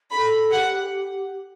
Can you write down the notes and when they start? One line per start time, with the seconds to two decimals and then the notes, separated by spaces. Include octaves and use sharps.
0.11 A4 B5
0.51 G4 F#5